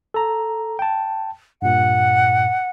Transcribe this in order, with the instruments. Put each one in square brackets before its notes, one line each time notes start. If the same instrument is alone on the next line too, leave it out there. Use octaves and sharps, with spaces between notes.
[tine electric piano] A4 A#5
G5 A5
[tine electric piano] G2 A#2 [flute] F#5